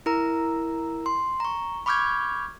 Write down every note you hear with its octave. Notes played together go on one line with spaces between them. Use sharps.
E4 A#4 A#5
C6
A#5 C#6
B5 C#6 D6 F6 G6 G#6